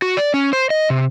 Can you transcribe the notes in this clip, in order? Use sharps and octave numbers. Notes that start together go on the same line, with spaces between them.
F#4
D5
C#4
C5
D#5
C3